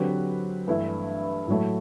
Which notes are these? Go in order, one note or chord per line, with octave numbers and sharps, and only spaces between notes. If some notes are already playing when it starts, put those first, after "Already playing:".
Already playing: D3 F#3 C4 G4 B4
G2 E3 A3 E4
A2 F#3 A3